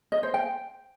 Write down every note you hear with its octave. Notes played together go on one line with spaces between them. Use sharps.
D#5
C5
G5